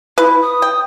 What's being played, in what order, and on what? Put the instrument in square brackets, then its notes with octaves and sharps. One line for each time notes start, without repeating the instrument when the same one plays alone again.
[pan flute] E4 [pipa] B4
[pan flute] D#6
[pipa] G5